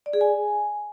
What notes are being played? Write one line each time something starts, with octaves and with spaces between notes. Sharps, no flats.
D5
G#4
G#5